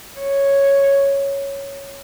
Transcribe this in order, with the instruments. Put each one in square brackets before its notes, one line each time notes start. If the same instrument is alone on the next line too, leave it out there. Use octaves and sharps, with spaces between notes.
[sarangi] C#5